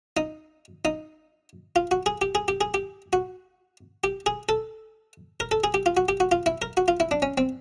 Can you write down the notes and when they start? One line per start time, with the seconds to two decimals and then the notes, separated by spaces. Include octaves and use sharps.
0.17 D#4
0.85 D#4
1.76 F4
1.91 F#4
2.06 G#4
2.21 G4
2.35 G#4
2.48 G4
2.61 G#4
2.74 G4
3.13 F#4
4.04 G4
4.26 G#4
4.49 A4
5.40 A#4
5.51 A4
5.64 G#4
5.74 G4
5.86 F4
5.97 F#4
6.09 G4
6.20 F#4
6.32 F4
6.46 E4
6.62 A#4
6.77 F#4
6.88 F4
7.00 E4
7.11 D4
7.22 C#4
7.38 C4